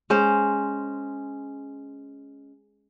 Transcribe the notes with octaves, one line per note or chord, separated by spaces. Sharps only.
G#3 C#4 C5